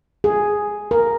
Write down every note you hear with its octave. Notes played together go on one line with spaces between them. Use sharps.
G#4
A#4